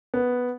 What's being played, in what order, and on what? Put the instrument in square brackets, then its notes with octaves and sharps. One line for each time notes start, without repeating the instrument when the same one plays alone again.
[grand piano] B3